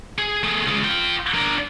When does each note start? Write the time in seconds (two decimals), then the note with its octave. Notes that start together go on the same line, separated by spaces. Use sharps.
0.18 G#4
0.43 A3 G#4
0.67 C#2 G#3
0.84 F4 G5
1.34 D4 A#4